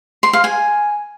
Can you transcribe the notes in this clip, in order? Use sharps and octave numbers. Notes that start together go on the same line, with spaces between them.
C6
F5
G#5